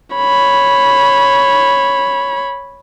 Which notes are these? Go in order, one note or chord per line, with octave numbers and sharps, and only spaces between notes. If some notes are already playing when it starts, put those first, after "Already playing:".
C#5 B5